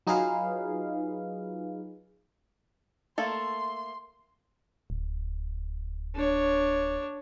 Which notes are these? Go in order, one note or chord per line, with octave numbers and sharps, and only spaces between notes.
F#3 D#4 F4 G#4 B4 F5
A3 A#3 A4 C6
D1
D4 C#5